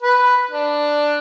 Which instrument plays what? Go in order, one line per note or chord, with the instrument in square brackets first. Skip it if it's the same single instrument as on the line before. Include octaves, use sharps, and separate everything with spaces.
[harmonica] B4
D4